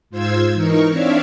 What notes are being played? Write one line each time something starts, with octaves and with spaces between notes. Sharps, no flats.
G#2 F4 C5 E6 G#6
E3 D#4 A#4 C#6
C4 D4 C#5 D5 E5 F5